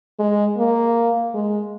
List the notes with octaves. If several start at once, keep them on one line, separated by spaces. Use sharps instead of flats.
G#3
A#3
G#3